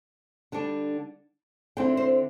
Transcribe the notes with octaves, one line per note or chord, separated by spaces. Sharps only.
D3 G3 D4
D3 C4 E4 G5
C5